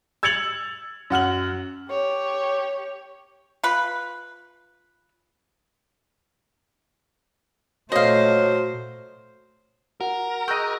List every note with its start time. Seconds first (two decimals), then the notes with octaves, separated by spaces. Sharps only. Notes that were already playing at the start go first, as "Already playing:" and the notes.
0.23 E6 G#6 A6 C#7 F7 F#7
1.10 F#2 F#5 F6 F#7
1.90 G4 C#5
3.63 F4 B4
7.92 A#2 F#3 A3 C5 D#5 F5
10.00 F#4 A#4 F#5
10.48 G#4 D#5 G5 C#6 E6 F#6